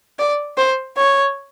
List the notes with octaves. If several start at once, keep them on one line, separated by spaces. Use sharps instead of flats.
D5
C5
C#5